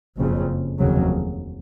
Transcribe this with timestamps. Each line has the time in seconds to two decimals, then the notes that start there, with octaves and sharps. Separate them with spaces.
0.18 F#1 F2 C#3
0.79 F1 D#2 C#3 F#3